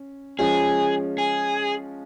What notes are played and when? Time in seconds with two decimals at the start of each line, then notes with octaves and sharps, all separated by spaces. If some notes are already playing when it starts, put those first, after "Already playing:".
Already playing: C#4
0.39 F3 G#3 C#4 G#4
1.18 G#4